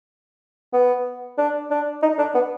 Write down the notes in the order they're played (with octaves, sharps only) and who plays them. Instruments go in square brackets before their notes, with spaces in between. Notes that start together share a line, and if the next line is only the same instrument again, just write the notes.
[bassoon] B3
D4
D4
D#4
D4
B3